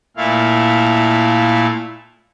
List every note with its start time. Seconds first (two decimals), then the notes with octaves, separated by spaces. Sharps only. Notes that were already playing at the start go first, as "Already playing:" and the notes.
0.17 A#2 A3 E4 F5